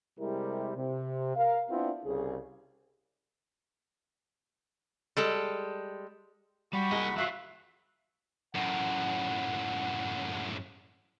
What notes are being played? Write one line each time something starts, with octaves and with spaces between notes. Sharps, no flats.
C3 G3 G#3 E4 A#4
C3
A#4 F5
B3 C4 D4 E4 F4
C2 C#3 G#4
G3 G#3 A4
G3 F#4 B5 C#6
C2 A#3 G#4 D#5
F3 F#3 E5 F5 F#6 B6 C7
F#2 A2 F#5